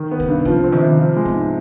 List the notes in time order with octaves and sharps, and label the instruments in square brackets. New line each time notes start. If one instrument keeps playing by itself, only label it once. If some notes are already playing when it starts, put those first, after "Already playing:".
Already playing: [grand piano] D#3
B3
[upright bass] C3
[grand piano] G2
[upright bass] B2
[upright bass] C3 [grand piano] F3
[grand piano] C4
[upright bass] D#3
[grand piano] C3
F3
G#3
[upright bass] B3
[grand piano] G#2